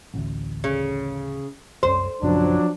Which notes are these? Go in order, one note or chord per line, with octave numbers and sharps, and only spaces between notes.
A1 D2
C#3
C2 F#2 C#4 C5
A#1 F#2 C#3 F3 F#3 D4